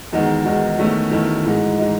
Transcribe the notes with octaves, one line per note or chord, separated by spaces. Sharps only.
E2 D#3 G#3 D#4 F#4
E2 D#3 G#3 D#4 F#4
E2 D#3 A3 C#4 E4
E2 D#3 A3 C#4 E4
G#2 E3 G#3 D#4
E3 G#3 D#4